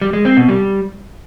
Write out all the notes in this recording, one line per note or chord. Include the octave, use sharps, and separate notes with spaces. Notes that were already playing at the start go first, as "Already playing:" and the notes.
G3
G#3
C4
B2
G3